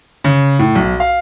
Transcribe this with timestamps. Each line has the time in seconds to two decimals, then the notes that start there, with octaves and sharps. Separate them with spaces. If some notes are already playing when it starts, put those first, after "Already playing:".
0.24 C#3
0.59 A2
0.75 B1
1.00 F5